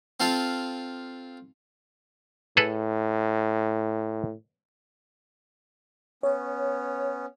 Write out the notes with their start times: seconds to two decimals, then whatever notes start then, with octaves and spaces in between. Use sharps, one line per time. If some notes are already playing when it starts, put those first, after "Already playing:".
0.20 C4 F4 A4 F5
2.57 A2 G#4 A4 B4
6.23 B3 C#4 C#5